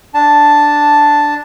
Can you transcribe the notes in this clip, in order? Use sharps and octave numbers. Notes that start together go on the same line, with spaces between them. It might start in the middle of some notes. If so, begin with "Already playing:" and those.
D4 A5